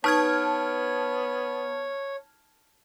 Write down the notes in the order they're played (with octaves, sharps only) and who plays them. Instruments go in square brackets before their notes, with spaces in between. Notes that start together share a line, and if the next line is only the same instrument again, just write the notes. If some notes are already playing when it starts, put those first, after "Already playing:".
[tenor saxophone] B3 [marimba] D#4 B4 C#6 [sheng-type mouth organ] C#5 [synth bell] A5 F6 G#6